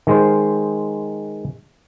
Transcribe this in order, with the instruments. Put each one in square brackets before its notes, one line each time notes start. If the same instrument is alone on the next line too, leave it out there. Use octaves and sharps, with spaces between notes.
[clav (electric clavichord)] D#3 G#3 C5